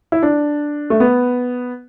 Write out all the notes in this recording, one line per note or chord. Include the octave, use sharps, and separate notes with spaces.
E4
D4
A3
B3